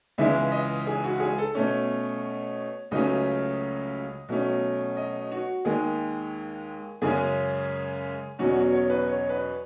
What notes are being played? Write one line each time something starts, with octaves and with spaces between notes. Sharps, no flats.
C#2 C#3 E3 G#3 E5
D#5
G#4
F#4
G#4
A4
B2 A3 C#4 C#5
C#2 C#3 F#3 A3 C#4 D#5
B2 F#3 A3 C#4
D#5
F#4
D#2 D#3 G#3 G#4
F#2 C#3 G#3 C#4 G#4
E2 B2 F#3 C#4 F#4
F#4
C#5
B4
C#5
B4